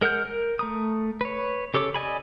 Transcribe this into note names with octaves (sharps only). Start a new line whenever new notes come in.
G#3 A#4 F#5 F6 G6
A#4
A3 A#5 D#6
B4 C#5
C#3 G4 A4 C#5 D6
D5 D#5 G#5 B5